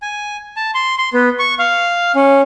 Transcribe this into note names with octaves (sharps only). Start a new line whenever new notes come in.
G#5
A5
C6
C6
B3
C#6
F5
C#4